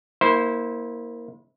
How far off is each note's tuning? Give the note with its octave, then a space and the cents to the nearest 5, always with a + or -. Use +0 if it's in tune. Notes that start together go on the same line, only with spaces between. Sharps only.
A#3 +10 E4 -25 C5 +0